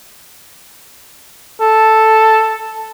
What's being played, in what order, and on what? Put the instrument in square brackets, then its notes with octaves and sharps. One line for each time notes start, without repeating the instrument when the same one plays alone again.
[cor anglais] A4